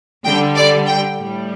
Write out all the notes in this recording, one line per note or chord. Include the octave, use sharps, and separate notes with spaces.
D3 G3 G5
D5
G5
A2 G3